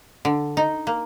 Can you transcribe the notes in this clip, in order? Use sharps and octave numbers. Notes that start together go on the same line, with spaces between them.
D3
D#4
A#3